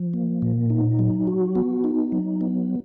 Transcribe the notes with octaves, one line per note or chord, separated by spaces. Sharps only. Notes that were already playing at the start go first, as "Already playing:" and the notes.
Already playing: F3
A#3
A#2
D#4
F#3
F#4
B3
D#4
F#3
B3